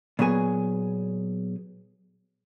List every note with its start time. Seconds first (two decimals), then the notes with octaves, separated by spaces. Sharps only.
0.19 A#2 F#3 B3 G#4 G#5